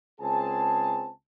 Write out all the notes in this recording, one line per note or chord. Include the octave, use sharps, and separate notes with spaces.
C#2 C4 G#4 G#5 A5